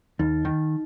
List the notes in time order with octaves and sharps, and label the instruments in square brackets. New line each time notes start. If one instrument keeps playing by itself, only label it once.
[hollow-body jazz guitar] D#2 [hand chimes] D#4
[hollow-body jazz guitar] D#3